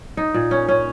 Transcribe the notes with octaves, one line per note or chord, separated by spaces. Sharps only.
D#4
A#2
C#4
C#4